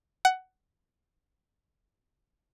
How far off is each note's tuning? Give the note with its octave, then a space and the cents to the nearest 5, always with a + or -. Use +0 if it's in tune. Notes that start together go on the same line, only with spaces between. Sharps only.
F#5 +15